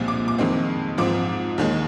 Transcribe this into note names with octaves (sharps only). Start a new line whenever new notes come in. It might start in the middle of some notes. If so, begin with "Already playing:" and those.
Already playing: C2 A#2 F3 G#3 C4
D6
D6
F2 D#3 G#3 C4
G#2 F3 C4 D6
D#2 D#3 G#3